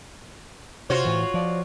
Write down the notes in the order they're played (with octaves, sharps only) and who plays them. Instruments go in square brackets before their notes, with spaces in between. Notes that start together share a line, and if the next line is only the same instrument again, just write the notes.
[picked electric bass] C3 [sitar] F4 F#4 C#5 [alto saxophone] C5
[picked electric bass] A2 E3
[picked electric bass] F3 [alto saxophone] D5